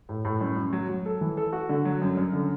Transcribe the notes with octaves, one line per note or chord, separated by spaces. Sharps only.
A2
A2
F#2
F#2
F#3
F#3
A4
E3
A4
F#4
D3
F#3
F#2
F#2
D3